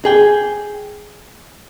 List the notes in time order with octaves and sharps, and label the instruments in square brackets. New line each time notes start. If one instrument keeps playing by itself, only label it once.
[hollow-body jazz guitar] G#4 G5